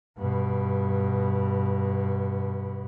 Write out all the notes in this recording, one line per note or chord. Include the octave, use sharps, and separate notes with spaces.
G2 B2